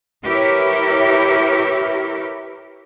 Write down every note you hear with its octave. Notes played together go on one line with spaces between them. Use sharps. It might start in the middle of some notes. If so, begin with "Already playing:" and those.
E4 G4 A#4 B4 C#5 E5